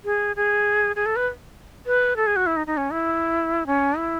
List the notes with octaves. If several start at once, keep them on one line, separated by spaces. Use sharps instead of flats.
G#4
G#4
G#4
A4
B4
B4
A4
G#4
F#4
E4
D#4
D#4
C#4
E4
C#4
E4